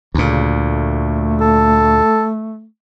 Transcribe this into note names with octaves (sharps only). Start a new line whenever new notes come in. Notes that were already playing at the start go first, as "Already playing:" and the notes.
D2 A#2 C#3
A3
A4